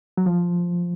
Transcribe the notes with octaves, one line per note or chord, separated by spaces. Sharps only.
F#3
F3